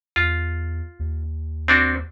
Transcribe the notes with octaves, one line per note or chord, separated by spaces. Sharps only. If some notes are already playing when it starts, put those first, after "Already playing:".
E2 F4
D#2
C4 D4 F#4